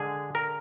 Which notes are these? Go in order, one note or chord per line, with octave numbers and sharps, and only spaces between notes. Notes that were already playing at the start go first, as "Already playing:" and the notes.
Already playing: D3 G#3 G#4
A#4